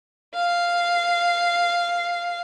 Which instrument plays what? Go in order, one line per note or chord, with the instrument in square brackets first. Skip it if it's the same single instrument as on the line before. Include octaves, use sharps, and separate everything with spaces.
[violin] F5 C7